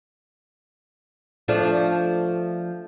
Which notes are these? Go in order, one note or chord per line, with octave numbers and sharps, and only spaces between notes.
F3 A3 D4